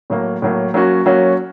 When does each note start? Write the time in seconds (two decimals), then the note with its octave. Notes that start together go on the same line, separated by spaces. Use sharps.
0.10 A2 F#3 A#3
0.42 A2 F#3 A#3
0.74 F#3 A#3 C#4 F#4
1.06 F#3 A#3 C#4 F#4